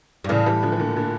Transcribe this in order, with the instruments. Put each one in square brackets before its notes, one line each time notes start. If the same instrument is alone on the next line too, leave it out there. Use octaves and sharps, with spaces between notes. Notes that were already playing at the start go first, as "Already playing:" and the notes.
[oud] G2
[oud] A2 [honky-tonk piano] C#3 E3
[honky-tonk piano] E3 G3
D3 F3
E3
A#2 D3
A#2 D3